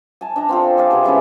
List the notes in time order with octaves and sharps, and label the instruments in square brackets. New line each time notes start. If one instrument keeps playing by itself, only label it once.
[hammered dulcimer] G#5 A5
D4 D#5 A#5
C4 F4 A4
G#4 D5 F5
C3 B3 G#4
E3 G#3 C#4 E4